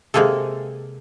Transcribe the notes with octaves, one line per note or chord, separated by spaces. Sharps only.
C3 G#3 A#3 G#4 A4